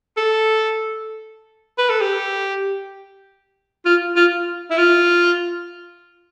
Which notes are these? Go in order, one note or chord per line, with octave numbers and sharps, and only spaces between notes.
A4
B4
A4
G4
F4
F4
E4
F4